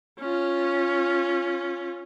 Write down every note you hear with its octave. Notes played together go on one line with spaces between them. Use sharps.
C#4 F4